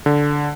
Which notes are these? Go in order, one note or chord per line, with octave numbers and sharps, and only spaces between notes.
D3